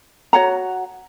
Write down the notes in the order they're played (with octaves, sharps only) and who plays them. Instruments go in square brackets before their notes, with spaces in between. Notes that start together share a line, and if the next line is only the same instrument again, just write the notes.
[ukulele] F#4 C#5 F#5 A#5